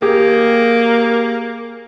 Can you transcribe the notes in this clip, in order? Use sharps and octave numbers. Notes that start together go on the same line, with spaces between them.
A#3 G4 G#4